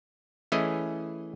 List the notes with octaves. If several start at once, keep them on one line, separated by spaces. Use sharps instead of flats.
E3 A3 C#4 E4 G#4 D#5